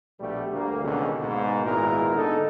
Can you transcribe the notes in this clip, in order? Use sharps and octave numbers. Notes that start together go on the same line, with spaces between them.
A#1 B2 G3 A3 B3 G4
D2 A#3
C#2 G#2 B2 D3 D#3
G#2 B2 A#3
G#1 A#2 G#3 B3 E4 A#4
D3 B3 D#4 A4